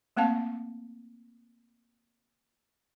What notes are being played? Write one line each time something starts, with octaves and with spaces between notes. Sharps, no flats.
A3 A#3 C4 F5 A5